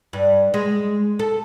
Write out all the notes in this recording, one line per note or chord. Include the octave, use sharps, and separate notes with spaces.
G2
G#3
A4